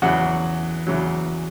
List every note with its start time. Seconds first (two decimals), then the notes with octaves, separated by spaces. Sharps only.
0.02 E2 C#3 F#3 F#4 F#5
0.87 E2 C#3 F#3